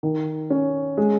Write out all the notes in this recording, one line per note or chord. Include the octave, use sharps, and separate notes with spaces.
D#3
C#4
G#3